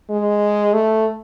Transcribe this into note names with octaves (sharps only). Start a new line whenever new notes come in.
G#3
A3